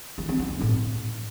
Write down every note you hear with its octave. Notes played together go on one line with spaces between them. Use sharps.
E3
C4
B3
C#4
A2